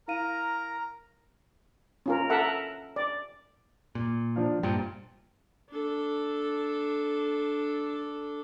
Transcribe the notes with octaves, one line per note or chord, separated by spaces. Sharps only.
E4 A#4 F5 A#5 D#7
C#4 F4 A#4
A4 A#4 E5 F#5
D5
A#2
F3 D4 F5
G2 A#2 C5 G5 A#5
D4 A4